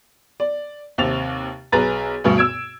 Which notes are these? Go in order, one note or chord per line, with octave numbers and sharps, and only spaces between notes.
D5
D#2 C3 A6 F7
B1 G#4 B4 A#5 A6
D2 G2 B2
E6 G#6 D7